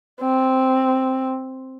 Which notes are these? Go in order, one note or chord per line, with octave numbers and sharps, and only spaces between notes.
C4